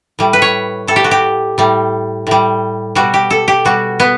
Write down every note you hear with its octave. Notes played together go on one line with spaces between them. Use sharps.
A2 G3
B4
C#5
A2 G3 A4
G4
F#4
G4
A2 G3
A2 G3
B2 G3 F#4
G4
A4
G4
B2 G3 F#4
B3